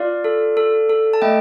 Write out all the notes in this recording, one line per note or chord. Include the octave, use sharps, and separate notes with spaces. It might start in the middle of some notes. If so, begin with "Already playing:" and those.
Already playing: F4 D5 F5
A4
A4
A4
A5
A3 D#5 G5